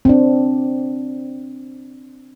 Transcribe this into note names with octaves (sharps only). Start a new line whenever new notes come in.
C4 D4